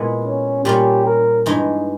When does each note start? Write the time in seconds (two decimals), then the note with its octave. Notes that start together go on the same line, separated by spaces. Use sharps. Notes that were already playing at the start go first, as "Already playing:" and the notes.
Already playing: A#2 G#3 B3 E4
0.25 C#4
0.64 A#2 G3 C#4 G4
1.06 A#4
1.46 G2 E3 G#3 D#4